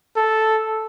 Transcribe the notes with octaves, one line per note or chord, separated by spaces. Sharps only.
A4